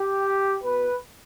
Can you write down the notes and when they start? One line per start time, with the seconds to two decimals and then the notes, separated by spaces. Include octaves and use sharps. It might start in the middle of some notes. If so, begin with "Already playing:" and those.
Already playing: G4
0.63 B2 B4